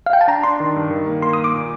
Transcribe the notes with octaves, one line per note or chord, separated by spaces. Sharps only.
F5
G5
A5
D4 A#5
D4 C6
D#3
G2
D#3
A#3
A#3 C6
D#6
A#3
D6
A#2